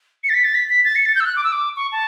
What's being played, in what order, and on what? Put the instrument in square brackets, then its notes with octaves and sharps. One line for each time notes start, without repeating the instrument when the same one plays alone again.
[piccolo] C#7
A6
B6
A6
B6
B6
A6
C#7
A6
G6
E6
F#6
D6
E6
D6
C#6
A5